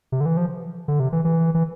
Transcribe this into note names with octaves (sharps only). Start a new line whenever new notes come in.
C3
D3
E3
F3
D3
C3
E3
E3
E3